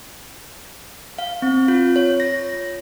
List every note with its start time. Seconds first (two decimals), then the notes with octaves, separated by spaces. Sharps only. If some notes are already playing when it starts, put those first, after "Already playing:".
1.18 F5
1.42 C4
1.68 F4
1.96 C#5
2.20 A#6